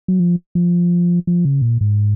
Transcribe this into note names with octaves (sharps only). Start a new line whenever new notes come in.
F#3
F3
F3
F3
C#3
A#2
G#2